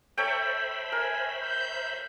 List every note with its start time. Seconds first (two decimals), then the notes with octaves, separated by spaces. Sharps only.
0.18 A4 C5 C#5 E5 G5 B5
0.92 A#4 G#5
1.40 G6